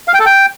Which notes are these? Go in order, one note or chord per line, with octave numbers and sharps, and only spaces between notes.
F5
G5
A4
G5